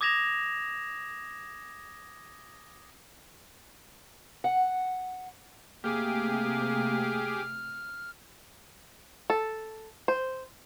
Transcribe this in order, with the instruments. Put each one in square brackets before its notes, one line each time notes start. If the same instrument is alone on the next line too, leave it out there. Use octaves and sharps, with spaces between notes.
[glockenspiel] D6 D#6 G#6 A#6 E7 F7
[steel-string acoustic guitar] F#5
[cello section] C3 A3 [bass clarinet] A#3 [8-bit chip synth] G4 G#4 D6 [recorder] F6
[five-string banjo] A4
C5